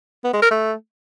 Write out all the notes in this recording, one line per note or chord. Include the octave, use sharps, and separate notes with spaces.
B3
G#3
A#4
A3